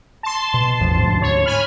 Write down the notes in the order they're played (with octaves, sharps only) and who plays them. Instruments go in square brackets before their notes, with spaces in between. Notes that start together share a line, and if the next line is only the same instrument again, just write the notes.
[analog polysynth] A5 C6
[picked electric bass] B2
A1 E2 F3
D2 G#2
[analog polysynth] C#5
G#5 B5 F6